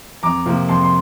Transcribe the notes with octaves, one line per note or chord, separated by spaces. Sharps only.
F2 A#5 D6
C3 F3 A#3
F2 A5 C6
C6